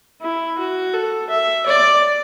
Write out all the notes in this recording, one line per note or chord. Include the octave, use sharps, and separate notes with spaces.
E4
F#4
A4
E5
D5